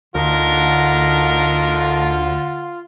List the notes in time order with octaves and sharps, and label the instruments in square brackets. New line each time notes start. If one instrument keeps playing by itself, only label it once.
[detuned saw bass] D2 [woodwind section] D3 [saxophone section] D4 D#4 A#4 [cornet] F4